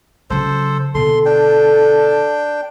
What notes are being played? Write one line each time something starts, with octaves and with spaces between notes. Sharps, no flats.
C#3 F#3 A4 C5
B2 D3 A4 C6
D4 G5